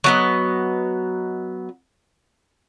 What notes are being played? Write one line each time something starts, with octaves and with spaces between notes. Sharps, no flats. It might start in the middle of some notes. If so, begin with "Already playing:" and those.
F#3 B3 D#5